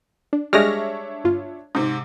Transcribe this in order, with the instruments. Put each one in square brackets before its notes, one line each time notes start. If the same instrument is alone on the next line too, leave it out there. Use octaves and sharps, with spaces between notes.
[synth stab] D4
[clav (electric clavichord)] G3 G#3 [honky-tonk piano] D4 C#5 E5 [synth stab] F6 A#6
[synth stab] G1 F4
[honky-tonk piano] G#2 C3 [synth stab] D#4